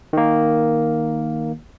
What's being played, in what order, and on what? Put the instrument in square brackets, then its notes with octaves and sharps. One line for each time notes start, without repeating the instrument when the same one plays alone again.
[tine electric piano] D#3 A#3